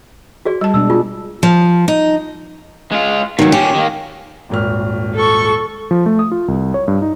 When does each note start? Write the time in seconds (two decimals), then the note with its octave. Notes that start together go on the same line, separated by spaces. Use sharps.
0.45 F#4 G#4 D5
0.61 G3 A5
0.74 B2 G#3 D4 E6
0.90 F4 G#4
1.43 F3
1.88 D#4
2.92 G#3 F4
3.39 C#2 B2 D#3 F#3
3.52 A#2 C#4 G4
3.74 D#3 A#3
4.49 D#1 G#1 F6
5.15 A4 C#6
5.91 F3
6.06 A3
6.19 D#6
6.32 F4
6.48 C2
6.74 C#5
6.88 G2
7.02 D#4